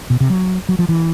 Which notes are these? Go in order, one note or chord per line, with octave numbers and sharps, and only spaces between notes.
B2
C3
F#3
F#3
F3
E3